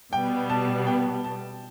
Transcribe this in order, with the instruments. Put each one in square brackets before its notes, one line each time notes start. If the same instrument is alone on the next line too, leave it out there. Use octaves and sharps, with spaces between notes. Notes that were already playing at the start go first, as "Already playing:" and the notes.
[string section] B2 G3 B3 [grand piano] G5
[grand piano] A5
G5
A5